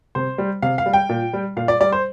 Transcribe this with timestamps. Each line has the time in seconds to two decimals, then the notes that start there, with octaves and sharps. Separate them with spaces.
0.15 C3 C5
0.38 G3
0.62 C3 F5
0.78 F5
0.86 G3
0.93 G5
1.09 A#2
1.33 G3
1.57 A#2 F5
1.68 D5
1.80 G3 D5
1.92 C5